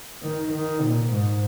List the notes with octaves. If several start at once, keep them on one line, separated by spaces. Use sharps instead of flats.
D#3
D#3
A#2
G#2